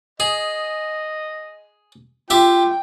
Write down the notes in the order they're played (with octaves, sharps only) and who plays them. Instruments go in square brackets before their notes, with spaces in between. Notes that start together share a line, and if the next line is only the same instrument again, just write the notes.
[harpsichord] G#4 [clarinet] D#5
[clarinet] F4 [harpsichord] G4 E5 [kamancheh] G5